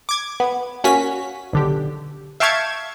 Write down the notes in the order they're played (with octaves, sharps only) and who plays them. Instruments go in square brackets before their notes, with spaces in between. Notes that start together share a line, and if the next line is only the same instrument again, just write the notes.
[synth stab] D6 G#6
B3
A#3 C#4 F#4 B6
B1 D3 G4
E5 F5 G5 A5 C#6 G#6